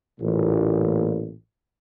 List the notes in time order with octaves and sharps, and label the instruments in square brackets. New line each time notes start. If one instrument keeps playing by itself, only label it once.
[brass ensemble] A1 A#2